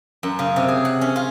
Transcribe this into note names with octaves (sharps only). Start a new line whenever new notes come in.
F#2
C#3
C3
G#4
F#5
C#4
F4